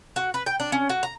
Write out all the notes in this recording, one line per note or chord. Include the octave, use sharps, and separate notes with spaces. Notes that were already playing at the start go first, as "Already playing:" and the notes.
F#4
B4
G5
D4
C#4
F#4
A#5